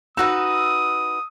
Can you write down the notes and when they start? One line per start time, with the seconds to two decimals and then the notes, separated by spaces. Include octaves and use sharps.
0.17 D#4 F#4 B4 D#6 E6